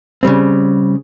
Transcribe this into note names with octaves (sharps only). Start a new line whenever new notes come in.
C#3 G3 C4